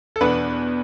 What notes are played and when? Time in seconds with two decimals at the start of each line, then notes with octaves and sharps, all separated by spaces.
0.16 A4
0.21 E2 B2 B3 D4 B4